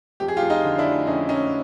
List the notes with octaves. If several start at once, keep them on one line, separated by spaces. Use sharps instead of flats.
F2 G4
G#4
F4 G4
F2
D#4 F4
D3
D4 E4
F3
F2 C#4 D#4
F2 C#4 D#4